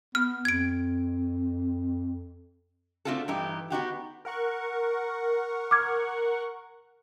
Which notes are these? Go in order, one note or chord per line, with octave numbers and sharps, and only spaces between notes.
B3 F6
F2 G#6 D7
A3 C4 D4 F4 F#4 A4
G2 E3 D#4 G4
B3 D#4 F#4 G4
A#4 F#5 C#6
D6 F6 G#6